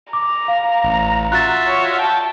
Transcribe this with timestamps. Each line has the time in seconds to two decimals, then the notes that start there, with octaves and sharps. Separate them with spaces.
0.13 A#5 D6
0.48 F5
0.84 A1
1.32 F4 F#4 E5 F#6 A6
1.67 C#5
1.99 G5 A5